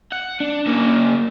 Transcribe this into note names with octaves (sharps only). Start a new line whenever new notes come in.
F#5
D4
C#3 A#3